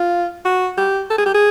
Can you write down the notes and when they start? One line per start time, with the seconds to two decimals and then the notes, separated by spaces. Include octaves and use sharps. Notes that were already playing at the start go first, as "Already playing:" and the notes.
Already playing: F4
0.45 F#4
0.78 G4
1.10 A4
1.18 G#4
1.25 G4
1.34 G#4